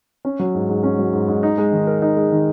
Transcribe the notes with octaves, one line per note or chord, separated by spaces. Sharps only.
C#4
F#3
G#2
G#2
C#4
F#3
G#2
G#2
D#4
G#3
D#3
A#4
D#4
G#3
D#3